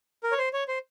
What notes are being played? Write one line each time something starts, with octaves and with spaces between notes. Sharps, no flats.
A#4
C#5
C5
C#5
C5